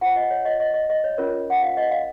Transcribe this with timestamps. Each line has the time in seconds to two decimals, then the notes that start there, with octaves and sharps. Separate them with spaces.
0.01 F4 C5 F#5
0.16 D#5
0.30 C#5
0.45 D#5
0.60 D#5
0.74 D#5
0.90 D#5
1.04 C#5
1.18 C#4 F4 A#4 C#5
1.50 F#5
1.63 F5
1.77 D#5
1.91 F5